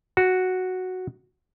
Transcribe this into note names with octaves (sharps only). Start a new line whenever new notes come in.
F#4